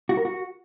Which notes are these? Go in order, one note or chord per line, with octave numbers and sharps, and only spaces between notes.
F#4
A#4
F#4